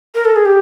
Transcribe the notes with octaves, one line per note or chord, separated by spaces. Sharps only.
A#4
A4
G#4
G4